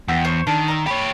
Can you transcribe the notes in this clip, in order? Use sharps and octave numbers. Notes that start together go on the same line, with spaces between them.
E2 F#5 G5 E6
C5 C#5 C6
D#3 D4
A#5 E6
G4 C#5 B5